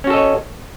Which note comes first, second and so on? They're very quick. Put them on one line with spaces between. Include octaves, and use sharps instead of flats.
C#4 F#4 A4 D#5 C#5